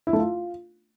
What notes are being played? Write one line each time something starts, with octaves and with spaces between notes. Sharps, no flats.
E4
A3
F4